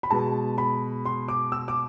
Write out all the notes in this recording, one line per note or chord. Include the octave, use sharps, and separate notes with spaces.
B5
B2 G#3 B3 A5
B5
C6
D6
E6
D6